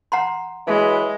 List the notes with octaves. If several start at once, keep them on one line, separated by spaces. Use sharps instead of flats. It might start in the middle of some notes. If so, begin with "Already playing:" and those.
F#5 A#5 C6
E3 F#3 G#3 B4